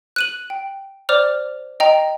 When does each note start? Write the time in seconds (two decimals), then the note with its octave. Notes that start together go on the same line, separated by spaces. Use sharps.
0.16 F#6 D#7 F#7
0.50 G5
1.09 C5 D5 D6 F6 F7
1.80 D#5 G5 A#5